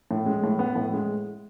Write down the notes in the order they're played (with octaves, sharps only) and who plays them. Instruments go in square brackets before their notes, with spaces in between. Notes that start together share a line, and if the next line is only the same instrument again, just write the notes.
[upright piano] A2
G#3
A2
B3
A2
G#3